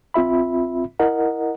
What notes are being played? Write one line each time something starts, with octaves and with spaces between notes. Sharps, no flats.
A#1 C4 F4 E5 B5
E4 A#4 D#5 F#5